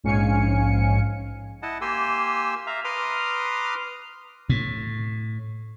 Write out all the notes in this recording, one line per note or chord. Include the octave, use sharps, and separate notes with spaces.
A#1 G#2 C#4 F5 G#5 C#7
E4 D#5 F#5 A5
A#3 G4 G#5 C6 E6
E5 F5 A#5
B4 A#5 C6 D6 D#6 F6
A2